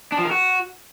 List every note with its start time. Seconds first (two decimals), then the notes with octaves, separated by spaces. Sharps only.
0.12 D4
0.19 F3
0.25 A#4
0.31 F#4